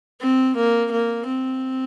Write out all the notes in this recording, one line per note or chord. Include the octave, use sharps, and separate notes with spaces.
C4
A#3
A#3
C4